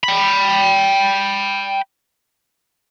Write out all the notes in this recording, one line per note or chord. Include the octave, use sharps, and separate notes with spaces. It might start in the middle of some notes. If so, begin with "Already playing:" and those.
G5 B5